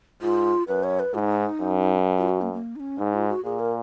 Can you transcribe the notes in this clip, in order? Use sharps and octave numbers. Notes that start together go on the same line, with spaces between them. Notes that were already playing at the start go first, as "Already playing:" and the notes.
G#2 F4
F#2 B4
C#5
B4
G#2 D#4 F4
F#2
F4
F#4
A#3
A#3
D#4
C#4
G#2 D#4
F4
F#4
A#2 G#4
A#4